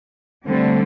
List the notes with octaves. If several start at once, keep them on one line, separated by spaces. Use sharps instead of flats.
D3 G3 A3 C4